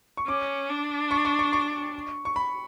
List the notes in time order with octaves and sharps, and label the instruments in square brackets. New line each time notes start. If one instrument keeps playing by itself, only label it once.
[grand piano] C#6
[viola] C#4 [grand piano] D6
[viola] D4
[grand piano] C#6
C#6
C#6
C#6
C#6
B5